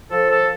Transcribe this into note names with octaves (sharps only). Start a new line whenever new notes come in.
F3 A4
A4